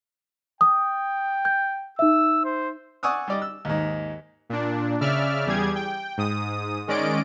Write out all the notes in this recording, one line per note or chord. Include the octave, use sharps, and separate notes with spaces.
G5 D#6
G6
D#4 E5 E6
C5
D5 F#5 G#5 C#6 D#6 E6
G3 D5 D#5
E6
D#2 G#2
A#2 D4
C#3 D5 E5 F6
E2 G3 G4 G#4 G#6
G5
G#2 D#6
D#3 G#3 C#4 D5 D#5 D7